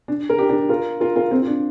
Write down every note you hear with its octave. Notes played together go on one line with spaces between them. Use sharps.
D4
A#4
D4 G4
D4 G4
F4 A#4
F4 A#4
F4 A#4
C4 F4
F4
D4